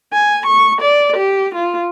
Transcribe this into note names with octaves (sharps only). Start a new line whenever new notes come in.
G#5
C#6
D5
G4
F4